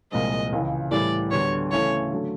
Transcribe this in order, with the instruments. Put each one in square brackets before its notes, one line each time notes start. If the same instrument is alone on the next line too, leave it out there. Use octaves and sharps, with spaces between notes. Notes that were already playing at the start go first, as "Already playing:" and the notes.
[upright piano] C2 A#2 F3 G#3 C4 [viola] D#5
[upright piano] C#2 C#3 E3
[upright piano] A2 E3 G3 [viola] D5
[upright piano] D2 D3 G3 B3 [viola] C#5
[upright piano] C#3 E3 A3 C#4 E4 [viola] C#5
[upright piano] D3 F#3 A3